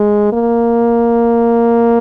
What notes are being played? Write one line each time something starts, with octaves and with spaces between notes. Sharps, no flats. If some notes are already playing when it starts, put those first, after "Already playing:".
Already playing: G#3
A#3